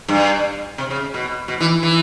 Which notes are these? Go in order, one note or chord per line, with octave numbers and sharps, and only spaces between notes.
G2
C3
C#3
B2
B2
E3
E3